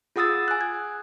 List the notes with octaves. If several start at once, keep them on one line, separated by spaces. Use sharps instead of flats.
F4 G#4 F#5 D#6 E6 A6
G#5 F#6
G#6